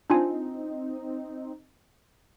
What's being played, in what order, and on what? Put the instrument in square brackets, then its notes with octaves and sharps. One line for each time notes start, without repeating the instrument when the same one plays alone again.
[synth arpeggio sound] C4 D#4 [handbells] D4 F4 G#5